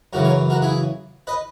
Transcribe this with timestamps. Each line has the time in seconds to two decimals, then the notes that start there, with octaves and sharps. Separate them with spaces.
0.13 F#2 C#3 E3 F#4 A#4
0.24 A#4 C#5
0.50 F#4 A#4
0.62 E4 G#4
1.27 B4 D#5